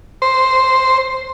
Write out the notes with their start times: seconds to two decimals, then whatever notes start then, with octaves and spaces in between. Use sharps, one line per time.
0.22 C5